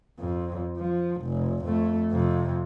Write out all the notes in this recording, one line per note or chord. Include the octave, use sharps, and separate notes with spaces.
F2
F3
F1
F2 A3
F2 C3